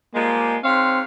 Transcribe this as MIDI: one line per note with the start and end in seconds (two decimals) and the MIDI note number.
0.15 0.57 53
0.15 0.57 55
0.15 0.57 56
0.15 0.57 58
0.64 1.04 44
0.64 1.00 60
0.64 1.04 73
0.64 1.04 77